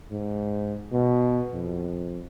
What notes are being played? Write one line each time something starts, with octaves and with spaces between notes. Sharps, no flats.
G#2
B2
F2